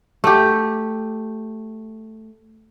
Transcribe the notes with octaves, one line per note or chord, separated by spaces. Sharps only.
A3 G4